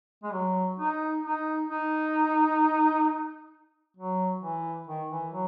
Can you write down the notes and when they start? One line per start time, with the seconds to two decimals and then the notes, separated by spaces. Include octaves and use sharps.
0.23 G#3
0.33 F#3
0.79 D#4
1.24 D#4
1.70 D#4
3.97 F#3
4.42 E3
4.87 D#3
5.11 E3
5.32 F#3